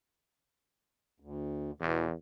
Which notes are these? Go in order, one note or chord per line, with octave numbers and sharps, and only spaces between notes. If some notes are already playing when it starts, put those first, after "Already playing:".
D2
E2 B2 E3